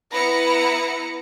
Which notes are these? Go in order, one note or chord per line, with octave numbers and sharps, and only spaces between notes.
B3 E4 B4 A#5 C#7